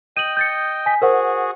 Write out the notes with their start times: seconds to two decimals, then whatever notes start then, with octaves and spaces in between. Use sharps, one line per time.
0.17 D#5 G5 D#7 F#7
0.37 G6 A6 C#7
0.86 G#5 B6
1.02 F#4 G#4 A#4 C5 F#5